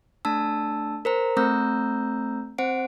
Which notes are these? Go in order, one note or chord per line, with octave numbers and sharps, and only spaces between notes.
A3 D4 A5 E6
A#4 C5 A#5
A3 C4 A#5 E6 G6
C4 C5 F#5 D7